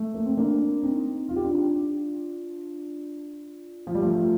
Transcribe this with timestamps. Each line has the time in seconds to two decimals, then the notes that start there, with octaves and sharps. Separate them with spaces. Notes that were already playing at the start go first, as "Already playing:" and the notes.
Already playing: A3
0.14 A#3
0.26 C4
0.37 A#3 D4
0.83 C4 D#4
1.29 F4
1.36 G4
1.45 D4 F4
3.87 F3
3.95 G3
4.03 F3 A3